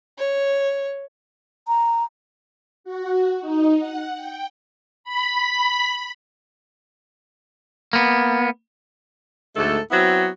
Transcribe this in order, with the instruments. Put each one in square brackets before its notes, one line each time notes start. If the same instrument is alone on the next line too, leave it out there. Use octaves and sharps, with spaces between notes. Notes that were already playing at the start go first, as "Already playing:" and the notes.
[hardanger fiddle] C#5
[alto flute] A#5
[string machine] F#4
D#4
F#5
G5
B5
[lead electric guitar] A#3 B3
[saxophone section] D2 G#2 A3 A4
F#3 B3 C4 E4 F#4